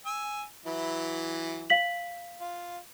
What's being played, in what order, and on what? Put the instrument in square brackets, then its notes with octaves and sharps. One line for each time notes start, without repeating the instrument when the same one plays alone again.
[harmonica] G#5 E6
E3 F#3 E4
[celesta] F5 B6 F#7
[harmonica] F4